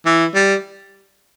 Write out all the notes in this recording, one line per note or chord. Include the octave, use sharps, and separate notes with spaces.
E3
G3